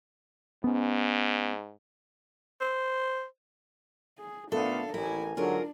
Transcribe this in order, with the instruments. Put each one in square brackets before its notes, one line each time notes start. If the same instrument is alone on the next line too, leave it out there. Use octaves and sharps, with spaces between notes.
[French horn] G#2 [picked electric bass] B3 C#4
[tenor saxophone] C5
[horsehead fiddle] G#4
[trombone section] A#2 A3 B3 [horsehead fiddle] D4 F5 [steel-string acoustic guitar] A4
[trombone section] A1 [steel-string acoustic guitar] E4 [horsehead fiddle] A#4 G#5
[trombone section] G#2 D3 F#3 [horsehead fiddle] D4 [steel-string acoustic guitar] F4 G#4 A#4